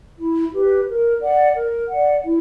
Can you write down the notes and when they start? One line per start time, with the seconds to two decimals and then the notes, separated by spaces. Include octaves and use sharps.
0.18 E4
0.52 G4 B4
0.87 A#4
1.20 D5 F#5
1.55 A#4
1.89 D5 F#5
2.23 E4